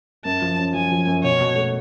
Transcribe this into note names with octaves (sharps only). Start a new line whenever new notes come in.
F#2 A5
F3
C#4
F3 G#5
F3
F#2
B2 C#5
B2
A3